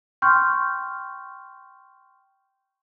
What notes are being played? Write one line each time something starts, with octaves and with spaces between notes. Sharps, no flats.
G5 C6 C#6 F6 G6